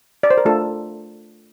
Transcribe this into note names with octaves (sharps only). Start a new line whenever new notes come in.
D5
C5
A#4
A3 D4 F4 A4